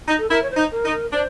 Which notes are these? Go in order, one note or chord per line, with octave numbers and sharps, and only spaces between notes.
D#4
A4
E4 A#4
C#5
C5
D#4
A#4
D#4
A#4
D4 C5